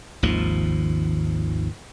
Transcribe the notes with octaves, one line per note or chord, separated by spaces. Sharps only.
G#1 D#2 F3